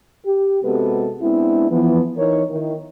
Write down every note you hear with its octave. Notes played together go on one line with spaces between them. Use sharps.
G4
C3 G#3 B3 F#4 A4 B4
G#3 B3 C4 D4 E4
E3 F3 B3
E3 D#4 A#4 C#5
D#3 E4